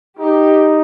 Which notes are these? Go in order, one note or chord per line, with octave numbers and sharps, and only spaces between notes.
D#4 G4